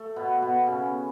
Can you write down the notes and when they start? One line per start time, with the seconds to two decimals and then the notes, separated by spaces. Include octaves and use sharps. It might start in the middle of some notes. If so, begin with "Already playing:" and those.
Already playing: A3
0.16 B2 B3
0.42 B2 B3
0.67 C#3 C#4